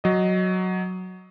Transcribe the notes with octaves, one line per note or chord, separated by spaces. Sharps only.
F#3 D#5